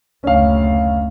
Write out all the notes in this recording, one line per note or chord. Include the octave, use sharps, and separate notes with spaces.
F#1 D2 C#4 F5